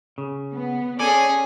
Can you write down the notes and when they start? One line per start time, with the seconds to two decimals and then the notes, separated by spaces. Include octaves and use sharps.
0.18 C#3
0.52 B3
0.99 C#4 G#4 A4 D5 G#5